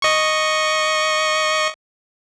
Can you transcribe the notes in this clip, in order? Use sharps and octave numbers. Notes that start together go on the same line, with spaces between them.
D#5 C#6